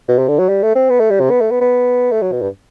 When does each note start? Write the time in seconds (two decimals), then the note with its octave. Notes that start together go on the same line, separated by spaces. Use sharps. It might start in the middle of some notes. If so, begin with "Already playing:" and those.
0.08 B2
0.18 C3
0.28 D3
0.39 F#3
0.49 G3
0.63 A3
0.75 C4
0.90 B3
1.00 A3
1.10 G3
1.20 C3
1.30 B3
1.41 A3
1.51 B3
1.61 B3
2.12 A3
2.22 F#3
2.32 B2
2.42 G2